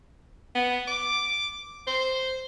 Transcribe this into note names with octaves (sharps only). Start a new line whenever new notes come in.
B3
D6
C5